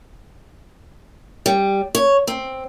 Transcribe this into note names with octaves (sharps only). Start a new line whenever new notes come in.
G3
C#5
C4